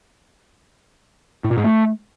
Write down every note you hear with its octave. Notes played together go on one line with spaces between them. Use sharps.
A2
A#2
G#2
A3